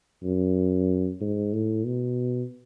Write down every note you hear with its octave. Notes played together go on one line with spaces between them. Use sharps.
F#2
G#2
A2
B2